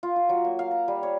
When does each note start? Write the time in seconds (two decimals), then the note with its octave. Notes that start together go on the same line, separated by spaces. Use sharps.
0.03 F4
0.16 F4
0.29 F#3
0.45 A#3
0.59 F5
0.71 A#5
0.88 G3
1.03 C#5